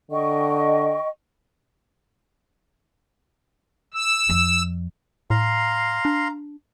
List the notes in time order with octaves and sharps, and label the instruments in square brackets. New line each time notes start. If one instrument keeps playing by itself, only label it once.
[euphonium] D3 [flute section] D#5 G5 C#6
[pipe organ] E6
[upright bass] F2
[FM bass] A2 [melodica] F5 A#5 C6
[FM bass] D4